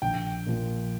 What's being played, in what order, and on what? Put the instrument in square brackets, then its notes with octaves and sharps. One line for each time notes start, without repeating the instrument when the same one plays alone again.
[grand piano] A#1 G5
A#2 F3